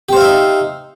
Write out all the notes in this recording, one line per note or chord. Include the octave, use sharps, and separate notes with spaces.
D#4 G4 C5 E5 F5